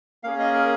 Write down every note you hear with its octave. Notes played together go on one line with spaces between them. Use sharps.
A#3 C#4 G#4 F5
D#5
A#4